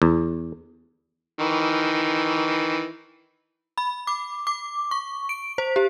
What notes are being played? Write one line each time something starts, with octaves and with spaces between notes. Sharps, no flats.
E2
D#3 E3
B5
D6
D6
C#6
D7
C5
G4